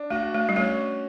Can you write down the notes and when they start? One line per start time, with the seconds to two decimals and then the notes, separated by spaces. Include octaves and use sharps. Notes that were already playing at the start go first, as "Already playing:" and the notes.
Already playing: D4
0.10 A3 F#4
0.34 A3
0.49 G3
0.56 A3 C#4